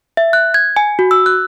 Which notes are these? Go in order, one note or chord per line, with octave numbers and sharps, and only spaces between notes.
E5
F#6
G#6
G#5
F#4
E6
F#6